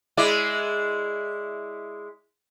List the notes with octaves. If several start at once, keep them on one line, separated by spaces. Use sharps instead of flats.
G#3 E4 D5